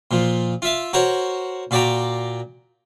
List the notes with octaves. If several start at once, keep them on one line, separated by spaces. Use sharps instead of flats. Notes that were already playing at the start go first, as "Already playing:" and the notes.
A#2 F3
F4 E5 F5
F#4 A#4 C5 C#5 F#5
A#2 F#4 D5 G5 A#5